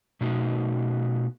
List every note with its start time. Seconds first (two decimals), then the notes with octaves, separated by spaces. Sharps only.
0.21 B2 A3 D#4 F#4